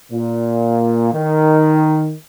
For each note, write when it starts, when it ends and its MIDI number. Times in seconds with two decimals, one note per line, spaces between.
0.12 1.13 46
1.14 2.13 51